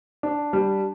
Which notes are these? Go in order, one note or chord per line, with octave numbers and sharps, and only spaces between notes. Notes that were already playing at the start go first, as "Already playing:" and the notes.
D4
G3